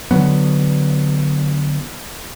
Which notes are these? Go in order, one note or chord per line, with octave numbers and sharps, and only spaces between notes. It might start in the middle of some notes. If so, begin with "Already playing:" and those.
D3 E3 F#3 B3